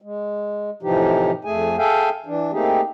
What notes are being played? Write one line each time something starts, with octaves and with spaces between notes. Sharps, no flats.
G#3
A2 C3 E3 F3 D#4 G4
F2 A3 G#4 G#5
G#4 A4 E5 F5 G5 G#5
E3 D4
A3 A#3 C4 D#4 G4 G#4